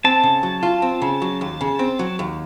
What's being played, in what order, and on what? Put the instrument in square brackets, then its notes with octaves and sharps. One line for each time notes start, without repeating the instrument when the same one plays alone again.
[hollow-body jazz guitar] C4 [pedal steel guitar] A5
[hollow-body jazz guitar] C#3
F#3
F4
C4
C#3
F#3
D#2
C#3
C4
F#3
D#2